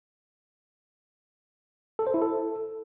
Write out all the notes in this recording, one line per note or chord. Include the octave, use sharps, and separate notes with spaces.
A4
C5
E4
A4